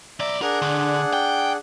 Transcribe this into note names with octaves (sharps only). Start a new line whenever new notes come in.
B1 D5 E5 A#5
D4 G#4 A#4 F#5
D3
G5